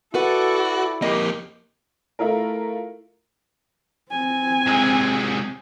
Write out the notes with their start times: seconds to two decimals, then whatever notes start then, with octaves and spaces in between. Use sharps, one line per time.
0.14 E4 F#4 A4 B4 D5 F#5
1.02 F2 A#3 G4 D#5
2.19 A3 E4 F4 A#4
4.10 C4 G#5
4.67 C3 G#3